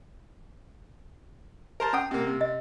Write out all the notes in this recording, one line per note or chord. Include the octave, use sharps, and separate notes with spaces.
A#4 C5 A5
C#4 F#5 G5 D#6
C3 A#3
C3
D#5